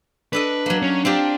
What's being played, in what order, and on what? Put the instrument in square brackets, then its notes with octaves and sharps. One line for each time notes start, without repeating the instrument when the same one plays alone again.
[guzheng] D4 A4 D#5 [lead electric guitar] B4
[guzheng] F#3 A#3
[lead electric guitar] C#4
[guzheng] C4 F4 G4 [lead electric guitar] D4